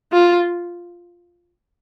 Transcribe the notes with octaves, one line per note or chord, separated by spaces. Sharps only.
F4